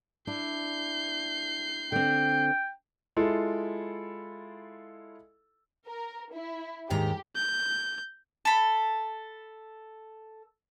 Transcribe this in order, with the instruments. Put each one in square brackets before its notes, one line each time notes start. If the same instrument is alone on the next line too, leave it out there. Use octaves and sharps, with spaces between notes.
[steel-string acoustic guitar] D4 E4 [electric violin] G6 C7
[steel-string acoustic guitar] D3 C4 [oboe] G5
[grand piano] G#3 E4 F4 A4
[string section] A#4
E4
[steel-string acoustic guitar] D#2 G#2 A#5 [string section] G4
[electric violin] G6
[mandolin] A4 B5